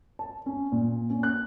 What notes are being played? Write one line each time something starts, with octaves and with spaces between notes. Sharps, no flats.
A5
C#4
A#2
C#4
F#6